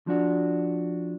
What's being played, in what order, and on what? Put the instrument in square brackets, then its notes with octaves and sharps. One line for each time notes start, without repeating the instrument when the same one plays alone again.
[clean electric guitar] F3 D4 F#4